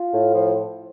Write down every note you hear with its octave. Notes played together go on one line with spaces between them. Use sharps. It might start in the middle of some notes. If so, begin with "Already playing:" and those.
Already playing: F4
A2
F3